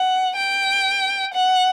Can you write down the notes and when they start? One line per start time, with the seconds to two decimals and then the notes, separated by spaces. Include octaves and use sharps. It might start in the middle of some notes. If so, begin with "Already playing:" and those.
Already playing: F#5
0.36 G5
1.34 F#5